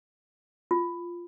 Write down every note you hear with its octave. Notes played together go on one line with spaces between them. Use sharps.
F4